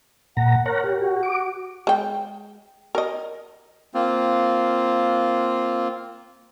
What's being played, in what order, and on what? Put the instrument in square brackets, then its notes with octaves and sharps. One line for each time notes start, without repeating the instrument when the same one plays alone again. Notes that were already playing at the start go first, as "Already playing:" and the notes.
[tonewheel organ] A#2 A#5 [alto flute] F#5
[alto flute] A#4 [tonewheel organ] C#5 F#5 A#5
[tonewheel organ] G4
[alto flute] F#4
[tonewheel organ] D6
[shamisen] G#3 G5
A#4 D#5
[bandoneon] A#3 C4 F4